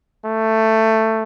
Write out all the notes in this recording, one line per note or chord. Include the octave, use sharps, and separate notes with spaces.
A3